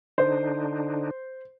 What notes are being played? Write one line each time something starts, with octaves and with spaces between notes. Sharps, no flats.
D3 D4 D#4 C5